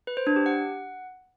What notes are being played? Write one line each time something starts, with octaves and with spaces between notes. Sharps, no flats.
B4
C5
D4
G4
F#5